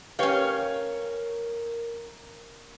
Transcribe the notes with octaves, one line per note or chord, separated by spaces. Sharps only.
C#4 G4 A#4 B4 C#5 F5 G5